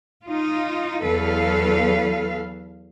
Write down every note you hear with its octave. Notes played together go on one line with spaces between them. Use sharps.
D#4 F4
E2 F#3 A4 B4 F5